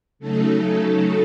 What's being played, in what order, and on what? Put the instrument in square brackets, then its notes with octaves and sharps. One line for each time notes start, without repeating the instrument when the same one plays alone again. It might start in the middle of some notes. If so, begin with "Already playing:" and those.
[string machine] C#3 F#3 A3 D#4 A4